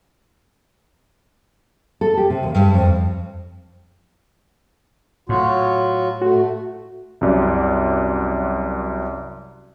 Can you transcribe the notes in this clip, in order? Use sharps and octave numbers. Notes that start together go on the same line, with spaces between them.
A4
G4
C3
D#2
G2
F2
A2 F#3 F4 F#4
A3 F#4
C2 F#2 D5